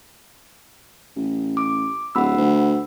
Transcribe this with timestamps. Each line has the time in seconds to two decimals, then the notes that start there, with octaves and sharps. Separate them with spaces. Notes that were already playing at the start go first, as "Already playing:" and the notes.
1.16 A1
1.57 D6
2.15 D1 F#5 B5 E6
2.37 D2